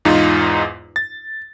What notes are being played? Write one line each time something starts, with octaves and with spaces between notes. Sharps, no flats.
E2 G#2 D#4 F4
A6